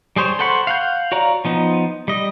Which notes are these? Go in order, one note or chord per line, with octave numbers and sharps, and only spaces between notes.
G3 G#4 C5 C#5
A4 C5 F#5 B5 C#6
F5 F#5 G6
F#4 C#5 D5 F5 A#5
F3 B3 D#4
G3 D#5